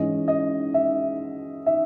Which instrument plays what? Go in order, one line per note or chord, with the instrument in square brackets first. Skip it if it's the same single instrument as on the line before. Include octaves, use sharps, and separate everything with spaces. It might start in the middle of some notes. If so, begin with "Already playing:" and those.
Already playing: [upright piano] G#2 E3 G#3 C#4 D#5
D#5
E5
E5